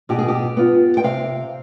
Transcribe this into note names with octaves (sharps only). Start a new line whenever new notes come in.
B2 G4
G#4
G4
B3 F4
G5
C3 F5